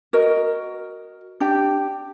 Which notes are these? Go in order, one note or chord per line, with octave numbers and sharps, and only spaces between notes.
F#4 A#4 D#5
D4 G4 G5